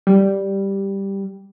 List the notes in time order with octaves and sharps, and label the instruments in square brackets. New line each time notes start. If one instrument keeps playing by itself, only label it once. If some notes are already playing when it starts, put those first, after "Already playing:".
[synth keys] G3